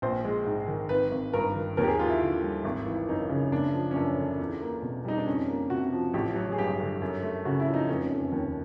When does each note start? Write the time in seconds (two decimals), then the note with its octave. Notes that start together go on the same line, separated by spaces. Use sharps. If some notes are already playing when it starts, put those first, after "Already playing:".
0.02 A#1 C5
0.25 G#3
0.46 G#2
0.68 D#3
0.89 G#1 B4
1.11 G#1
1.33 G2 A#4
1.55 D#3
1.77 D#2 A#4
1.83 G4
1.87 G#4
1.99 A#3 F4
2.10 E4
2.21 D3
2.42 G3
2.65 G#1
2.86 E3
3.09 F#2 D#4
3.29 C#3
3.52 F#1 D4
3.74 F3
3.91 C#4
3.96 F#2 D4
4.18 D3
4.40 E2
4.62 A#3
4.82 B2
5.05 G3 D#4
5.18 D4
5.27 F2 C#4
5.48 A#3
5.70 C3 F#4
5.93 F3
6.14 A1 G4
6.35 F#3
6.52 G#4
6.58 G2 G4
6.80 D3
7.02 F#2
7.23 A3
7.45 C#3 F#4
7.60 E4
7.67 F3
7.74 D#4
7.89 F1 C#4
8.11 F1
8.32 D#2